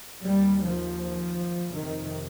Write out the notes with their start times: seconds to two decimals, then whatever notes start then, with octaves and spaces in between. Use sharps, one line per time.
0.24 D#2 G3
0.62 F3
1.74 F2 C3 D#3